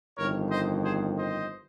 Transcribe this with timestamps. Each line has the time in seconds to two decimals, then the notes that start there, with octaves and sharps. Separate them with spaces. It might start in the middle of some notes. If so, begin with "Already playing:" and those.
0.17 G1 F2 D#3 A#4 C#5
0.51 C5 D#5
0.85 G#4 C5
1.19 C5 D#5